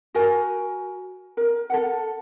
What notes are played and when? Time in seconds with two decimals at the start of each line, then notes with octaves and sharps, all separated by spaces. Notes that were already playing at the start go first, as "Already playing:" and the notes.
0.15 F#4 A#4 G#5
1.37 A#4
1.70 A4 A#4 F#5